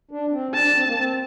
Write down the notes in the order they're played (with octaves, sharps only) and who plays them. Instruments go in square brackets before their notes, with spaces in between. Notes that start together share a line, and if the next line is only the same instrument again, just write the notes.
[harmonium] D4
C4
[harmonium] D4 [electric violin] A5
[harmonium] D4
C4
A#3
C4